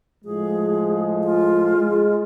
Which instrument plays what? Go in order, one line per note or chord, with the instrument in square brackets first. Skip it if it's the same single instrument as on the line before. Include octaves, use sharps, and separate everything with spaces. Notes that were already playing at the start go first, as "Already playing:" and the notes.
[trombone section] A2 F3 G#3 [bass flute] G#4
[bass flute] F4
[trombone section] G#3